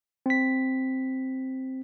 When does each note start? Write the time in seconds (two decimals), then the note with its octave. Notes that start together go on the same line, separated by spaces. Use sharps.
0.26 C4 B6